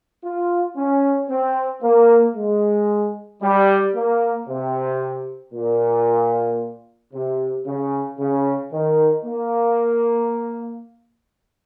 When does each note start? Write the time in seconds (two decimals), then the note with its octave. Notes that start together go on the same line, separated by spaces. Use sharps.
0.24 F4
0.77 C#4
1.30 C4
1.83 A#3
2.36 G#3
3.42 G3
3.95 A#3
4.48 C3
5.54 A#2
7.13 C3
7.66 C#3
8.19 C#3
8.72 D#3
9.25 A#3